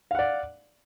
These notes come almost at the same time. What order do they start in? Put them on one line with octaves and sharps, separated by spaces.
F5 F#5 D5